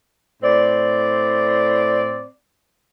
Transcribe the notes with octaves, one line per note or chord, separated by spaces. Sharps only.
A2 C4 D5